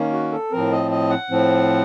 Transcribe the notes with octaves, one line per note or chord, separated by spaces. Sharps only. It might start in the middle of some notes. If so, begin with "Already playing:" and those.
Already playing: D#3 A#3 C#4
F#4
A4
A2 F3 C4 A#4
D#5
D#5
F#5
A2 F3 C4